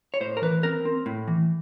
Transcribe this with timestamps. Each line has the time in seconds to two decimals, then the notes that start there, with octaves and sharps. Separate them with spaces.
0.14 C#5
0.21 A2 C5
0.37 A#4
0.42 E3 B4
0.63 C4 A#4
0.85 C4
1.06 A2
1.28 E3